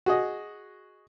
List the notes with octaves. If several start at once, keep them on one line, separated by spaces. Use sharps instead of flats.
F#4 G#4 D#5